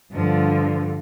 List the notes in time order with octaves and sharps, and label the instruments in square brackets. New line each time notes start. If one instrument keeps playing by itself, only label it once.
[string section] G2 [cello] D3 F3